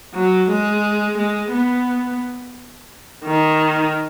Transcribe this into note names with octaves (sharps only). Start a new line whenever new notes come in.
F#3
G#3
G#3
B3
D#3